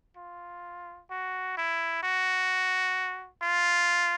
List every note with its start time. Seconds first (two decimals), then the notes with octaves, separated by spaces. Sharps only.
0.17 F4
1.10 F#4
1.57 E4
2.03 F#4
3.43 F4